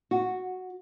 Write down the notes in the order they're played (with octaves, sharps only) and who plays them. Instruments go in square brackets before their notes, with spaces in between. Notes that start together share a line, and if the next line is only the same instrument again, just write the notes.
[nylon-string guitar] F#4